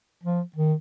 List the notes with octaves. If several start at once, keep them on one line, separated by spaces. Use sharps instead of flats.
F3
D#3